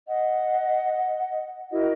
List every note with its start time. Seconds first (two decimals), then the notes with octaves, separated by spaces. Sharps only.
0.06 D#5 F#5
1.72 E4 F#4 A#4 D#5